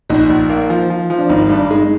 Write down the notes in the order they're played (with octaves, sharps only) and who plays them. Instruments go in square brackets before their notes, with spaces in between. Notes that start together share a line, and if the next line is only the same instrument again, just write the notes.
[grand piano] A#1 [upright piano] D#4
[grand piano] A#1
A#3
F3
F3
F3
[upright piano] D4
[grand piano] G#1 [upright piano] D#4
[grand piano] G2 [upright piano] D4
[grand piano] G#3 [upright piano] D#4
[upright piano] D#4